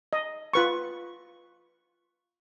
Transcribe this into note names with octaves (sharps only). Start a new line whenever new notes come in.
D#5
F4 B4 C#6